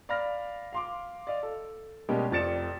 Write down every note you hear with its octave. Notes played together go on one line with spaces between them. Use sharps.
D5 F5 B5 F6 A#6
F5 C6 D6
D5 D#5 F5
A4
B2 G3 G#3 A#3 C#4 G4
F1 F2 D5 A6 C#7 E7